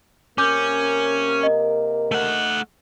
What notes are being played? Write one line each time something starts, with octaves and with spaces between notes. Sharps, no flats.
C3 A#3 C#4 A#4 D6 G6
D#5
A3 F#5